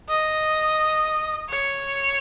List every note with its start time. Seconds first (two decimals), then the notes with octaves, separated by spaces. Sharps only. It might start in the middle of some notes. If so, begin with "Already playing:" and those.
0.09 D#5
1.49 C#5